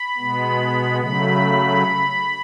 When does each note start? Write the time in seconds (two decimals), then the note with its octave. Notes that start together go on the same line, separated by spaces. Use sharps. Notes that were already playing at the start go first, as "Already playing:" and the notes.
Already playing: B5
0.17 B2 G#3 B3
1.00 C#3 F#3 A3 B5